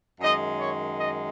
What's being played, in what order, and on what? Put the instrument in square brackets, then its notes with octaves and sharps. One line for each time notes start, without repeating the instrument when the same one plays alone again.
[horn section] F#2 D#3 G#3 D#5
C#5
D#5